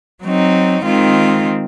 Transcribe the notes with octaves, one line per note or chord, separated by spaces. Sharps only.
F#3 C4 D#4
D#3 G#3 C4 F4